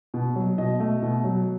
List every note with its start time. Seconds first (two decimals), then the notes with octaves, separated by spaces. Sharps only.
0.14 B2
0.36 F#3
0.58 B2 D#5
0.80 A3
1.02 B2
1.24 F#3